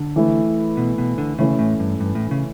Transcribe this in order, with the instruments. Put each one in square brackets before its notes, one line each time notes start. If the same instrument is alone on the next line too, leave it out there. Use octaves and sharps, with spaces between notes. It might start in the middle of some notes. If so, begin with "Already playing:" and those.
Already playing: [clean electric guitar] D3
[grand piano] E3 A3 E4
[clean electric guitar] B2
B2
D3
[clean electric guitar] C#3 [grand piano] E3 A3 C#4 E4
[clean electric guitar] A2
G2
G2
A2
C#3